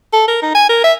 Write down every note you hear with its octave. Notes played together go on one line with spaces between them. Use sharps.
A4
A#4
D#4
G#5
A#4
E5